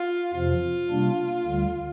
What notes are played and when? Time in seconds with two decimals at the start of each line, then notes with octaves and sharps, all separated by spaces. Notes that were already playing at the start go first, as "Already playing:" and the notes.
Already playing: F4
0.34 F2 C3 F3 F4
0.90 C3 G3 A#3 D4
1.46 D2 D3 G3